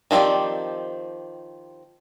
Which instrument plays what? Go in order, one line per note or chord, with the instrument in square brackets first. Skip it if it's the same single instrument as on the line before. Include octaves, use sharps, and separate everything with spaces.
[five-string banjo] D#3 F3 C4 G4 D5